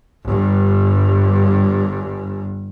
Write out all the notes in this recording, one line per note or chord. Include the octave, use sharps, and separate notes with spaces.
G1 G2